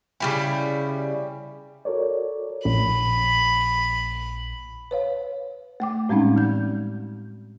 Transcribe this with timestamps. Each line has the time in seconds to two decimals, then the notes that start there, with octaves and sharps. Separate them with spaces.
0.20 C#3 G3 E4
1.85 F#4 A4 A#4 C#5 D5
2.65 A#1 B5
4.91 B4 C#5 F5
5.80 A3 G5 D6
6.09 A2 G3 G#3 C4 C#4 D#4
6.36 E3 G6